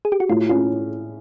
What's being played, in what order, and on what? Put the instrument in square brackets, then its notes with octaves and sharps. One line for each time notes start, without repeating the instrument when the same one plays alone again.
[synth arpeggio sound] G#4
G4
F#4
[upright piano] A2 [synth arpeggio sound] F4
[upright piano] C#4 [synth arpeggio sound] F4